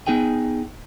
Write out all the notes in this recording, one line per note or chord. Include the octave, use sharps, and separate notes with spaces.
B3 D#4 G#4 G5 G#5